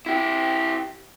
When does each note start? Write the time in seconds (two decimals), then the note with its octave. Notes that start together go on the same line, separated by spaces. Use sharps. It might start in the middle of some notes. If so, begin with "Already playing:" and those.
0.06 E4 G4